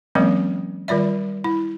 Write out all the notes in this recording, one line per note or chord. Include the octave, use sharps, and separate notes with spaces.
E3 F#3 G#3 A#3 C4 C#4
D#3 G3 F4 D5 E5
E4